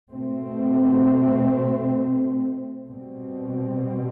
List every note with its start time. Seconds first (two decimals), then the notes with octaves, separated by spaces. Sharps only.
0.13 B2 A3 C4
2.89 B2 G3 C4